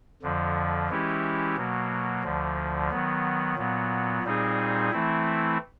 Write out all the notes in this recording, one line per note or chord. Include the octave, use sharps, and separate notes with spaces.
F2 D3 F3
E3 G#3 C#4 E4 G4
B2 F#3 A#3
D2 D3 F3
D#3 F#3 B3
A#2 F#3 B3
A#2 G3 C4 D#4 G#4
E3 A3 C4 E4